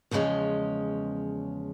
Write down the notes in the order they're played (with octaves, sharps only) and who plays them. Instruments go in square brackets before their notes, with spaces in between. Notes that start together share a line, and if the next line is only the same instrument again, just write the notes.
[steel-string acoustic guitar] E2 C#3 F3 G#3 C#4